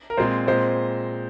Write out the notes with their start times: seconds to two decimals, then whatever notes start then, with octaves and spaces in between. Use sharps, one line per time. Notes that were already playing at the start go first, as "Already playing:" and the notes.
0.10 A#4
0.17 A#2 G#3 C4 C5
0.47 A#2 G#3 C4 C5